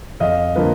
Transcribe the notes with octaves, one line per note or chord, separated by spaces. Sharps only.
F2 D#5 F5
D3 F3 A#3 B4